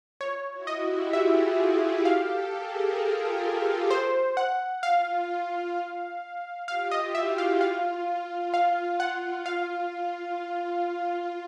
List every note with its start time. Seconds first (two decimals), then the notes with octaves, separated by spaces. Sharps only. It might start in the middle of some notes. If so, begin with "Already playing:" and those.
0.20 F4 C#5
0.51 E4 F#4
0.67 D#5
0.82 F4 G4
1.13 F#4 G#4 E5
2.05 G4 A4 F5
2.52 G#4 A#4
2.98 F4 G4
3.91 C5
4.37 F#5
4.83 F4 F5
6.68 F4 G4 F5
6.91 D#5
7.14 E4 F#4 E5
7.38 F5
7.61 F4 F5
8.54 F5
9.00 F#5
9.46 F4 F5